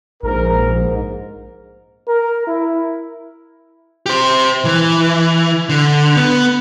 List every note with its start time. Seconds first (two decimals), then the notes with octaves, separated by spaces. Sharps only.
0.23 A#1 G#2 A#4
2.08 A#4
2.47 E4
4.06 G4 C5
4.65 E3
5.69 D3
6.16 B3